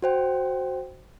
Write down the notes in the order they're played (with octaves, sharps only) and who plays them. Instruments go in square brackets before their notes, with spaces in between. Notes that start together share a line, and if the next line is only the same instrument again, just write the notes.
[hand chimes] F#4 C5 G5